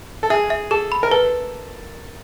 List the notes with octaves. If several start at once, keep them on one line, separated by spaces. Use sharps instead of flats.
A4
G#4 E5
E5
G#4 A4
B5
A#4
A4 B4